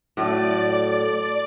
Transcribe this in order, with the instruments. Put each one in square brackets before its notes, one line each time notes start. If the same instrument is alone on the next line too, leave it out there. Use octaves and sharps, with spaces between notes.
[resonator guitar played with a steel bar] A2 F#3 [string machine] D5